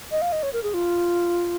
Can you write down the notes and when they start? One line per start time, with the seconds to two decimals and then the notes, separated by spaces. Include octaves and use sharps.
0.11 D#5
0.22 F5
0.32 D#5
0.43 C#5
0.53 A#4
0.63 G#4
0.74 F4